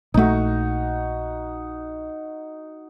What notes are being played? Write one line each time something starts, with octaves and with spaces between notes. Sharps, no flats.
A#1 A3 D#4 F#4